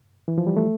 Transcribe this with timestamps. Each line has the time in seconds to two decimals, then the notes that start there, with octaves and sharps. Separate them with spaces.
0.28 E3
0.38 F3
0.47 G3
0.57 A3